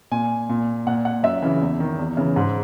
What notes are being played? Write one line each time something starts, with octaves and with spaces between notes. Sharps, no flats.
A#2 G#5
A#2
A#2 F#5
F#5
F#2 E5
C#3 E3
E2
D#3
E2
C#3 E3
G#2